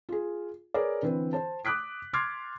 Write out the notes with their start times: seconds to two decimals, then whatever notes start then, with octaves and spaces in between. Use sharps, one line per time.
0.09 F4 G#4
0.74 G#4 A#4 B4 C#5 D5
1.02 D3 E3 C4 B4
1.33 C5 A5
1.65 D6 D#6 F#6 B6 D7
2.13 C6 D6 F6 G#6 A6 C7